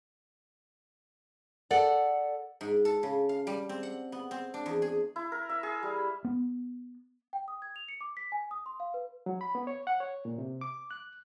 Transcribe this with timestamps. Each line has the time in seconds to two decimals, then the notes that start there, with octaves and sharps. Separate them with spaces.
1.71 A4 D5 F#5
2.61 G#2
2.85 A4
3.03 C#3
3.29 F5
3.47 G3
3.69 C4
3.83 F#5
4.12 B3
4.31 C4
4.54 D4
4.66 E2
4.82 G#4
5.16 E4
5.32 A#4
5.49 E5
5.63 G#4
5.83 G3
6.25 B3
7.33 G5
7.48 D#6
7.62 G#6
7.76 F7
7.88 C#7
8.01 D6
8.17 B6
8.32 G#5
8.51 D#6
8.66 C6
8.80 F5
8.94 B4
9.26 F#3
9.41 B5
9.55 B3
9.67 C#5
9.87 F#5
10.00 C#5
10.25 A#2
10.38 C3
10.61 D6
10.91 F#6